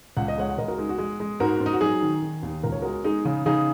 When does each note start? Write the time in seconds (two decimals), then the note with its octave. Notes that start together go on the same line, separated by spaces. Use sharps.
0.17 C#2 F#5
0.28 D#5
0.38 G#3 C#5 F#5
0.49 F#5
0.58 C#2 A#4 D#5
0.68 F#4 A#4
0.78 G#3 D#4
0.89 F#4
0.98 G#3
1.20 G#3
1.40 G#2 F#4 A#4
1.60 G#2
1.66 D#4
1.73 F#4
1.81 F#3 D#4 G#4
2.02 D#3
2.22 D#3
2.43 D#2
2.63 C#2 A#4
2.72 C#5
2.82 G#3 F#4 A#4
3.04 G#3 D#4 G#4
3.25 C#3
3.46 C#3 D#4 G#4